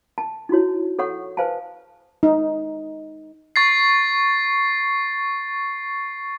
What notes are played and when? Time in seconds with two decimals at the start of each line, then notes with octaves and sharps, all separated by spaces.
0.18 A5
0.49 D#4 E4 F#4 C#5
0.99 A4 C#5 F#5 C#6
1.37 B4 C5 F5 G#5 A5
2.23 D#4
3.56 C#6 A6 C7